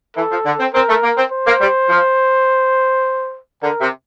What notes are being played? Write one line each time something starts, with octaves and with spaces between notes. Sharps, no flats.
E3 A4
F3
D3
C4
C4 A#4
A3
A#3
C4
C5
A#3
G3
F3
D3 A#4
C3